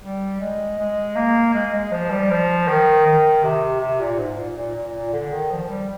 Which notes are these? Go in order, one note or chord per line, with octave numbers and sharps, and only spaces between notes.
G3
G#3
G#3
A#3
G#3
G#3
F3
G3
F3
D#3
D#3
C3
C3
A#2
G#2
A#2
A#2
A#2
A#2
D3
D#3
F3
G3